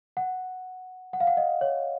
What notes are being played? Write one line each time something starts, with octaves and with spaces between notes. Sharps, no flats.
F#5
F#5
F5
F#5
D#5
C#5